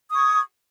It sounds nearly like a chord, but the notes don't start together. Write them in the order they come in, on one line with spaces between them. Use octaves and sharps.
D#6 C#6 G#6